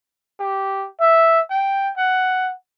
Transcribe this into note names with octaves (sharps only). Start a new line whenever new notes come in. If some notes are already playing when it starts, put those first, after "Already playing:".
G4
E5
G5
F#5